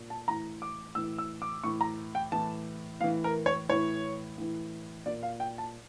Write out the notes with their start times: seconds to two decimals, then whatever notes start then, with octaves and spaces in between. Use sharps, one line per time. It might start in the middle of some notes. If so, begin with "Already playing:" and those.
Already playing: A#2
0.10 A5
0.27 A2 E3 A#5
0.62 D6
0.95 A2 E3 E6
1.18 E6
1.42 D6
1.64 A2 E3 C#6
1.81 A#5
2.15 G5
2.32 A2 E3 A5
3.00 A2 F5
3.04 E3
3.24 A#4
3.46 C#5
3.69 A2 E3 C#5
4.38 A2 E3
5.06 A#2 D5
5.23 F5
5.40 G5
5.58 A5